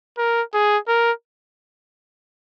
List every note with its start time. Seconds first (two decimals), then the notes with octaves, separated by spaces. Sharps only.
0.18 A#4
0.54 G#4
0.88 A#4